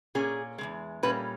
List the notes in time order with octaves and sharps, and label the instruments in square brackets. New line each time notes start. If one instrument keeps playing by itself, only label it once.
[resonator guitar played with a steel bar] A#2 A#3 C#4 G#4
E2 C#3 G#3
A#2 G3 A#3 C#4 B4